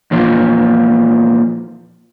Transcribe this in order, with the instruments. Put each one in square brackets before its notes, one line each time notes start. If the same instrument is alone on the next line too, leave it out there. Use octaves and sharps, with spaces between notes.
[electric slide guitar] E2 A#2 F3